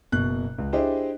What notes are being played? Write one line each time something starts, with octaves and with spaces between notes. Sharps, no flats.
F#1 B2 F#6
C#2
D4 E4 G4 G#4 C5 D#5